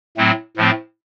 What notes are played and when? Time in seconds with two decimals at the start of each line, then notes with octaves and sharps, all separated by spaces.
0.17 A2 F#3 A3 C4
0.57 A2 F3 A3 C4